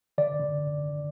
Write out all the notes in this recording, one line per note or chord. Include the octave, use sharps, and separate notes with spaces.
D3 D5
D3